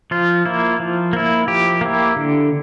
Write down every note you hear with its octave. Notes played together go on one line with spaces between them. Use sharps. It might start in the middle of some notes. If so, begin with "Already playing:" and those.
F3 F4
A#3 E4
F3
A#3 E4
F3 G4
A#3 E4
D3